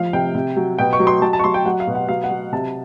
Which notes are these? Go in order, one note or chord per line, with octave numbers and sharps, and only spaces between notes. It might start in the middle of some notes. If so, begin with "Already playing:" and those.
Already playing: F3 F5
C3 G5
C3
F#3
B2 G5
C#6
F#3
C6
F#3 A5
A5
C#6
F#3 C6
G5
F#3 F#5
F5
B2
F#5
F#3 F5
F#5
F#3
C3 A5